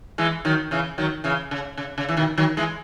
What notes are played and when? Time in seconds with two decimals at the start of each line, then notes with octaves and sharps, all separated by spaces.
0.18 E3 G#3
0.45 D#3 F#3
0.71 C#3 E3
0.98 D#3 F#3
1.24 C#3 E3
1.51 C#3
1.77 C#3
1.98 C#3
2.09 E3
2.17 B2 D#3
2.38 D#3 F#3
2.57 E3 G#3